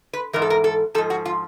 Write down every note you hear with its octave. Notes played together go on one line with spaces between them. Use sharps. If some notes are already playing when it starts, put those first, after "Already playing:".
B4
G#2 E3 A#4
A4
A#4
A4
G#2 F3 A4
F#4
F4